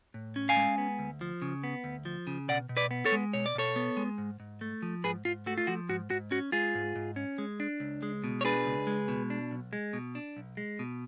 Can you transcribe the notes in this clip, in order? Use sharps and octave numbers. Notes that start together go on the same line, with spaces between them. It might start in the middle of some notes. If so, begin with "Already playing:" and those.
A2
C#4
F5 G#5
G#3
B3
D2
F3
C#3
B3
D2
F3
C#3
B2 D5 F#5
B2
B4 D5
B3
A4 C#5
G#3
B2 C#5
D5
B2 A4 C#5
B3
G#3
G#2
G#2
A3
F3
G#2 G#4 B4
G#2 F4
A3 F#4
F4
F3 F#4
G#2 F#4
G#2 F#4
C#4 F#4
G#3 F4 G#4
G#2
G#2
C#4
G#3
D4
C#2
G#3
B2
C#5
D4 G#4 B4
C#2
G#3
B2
D4
B1
G#3
B2
D4
B1
G#3
B2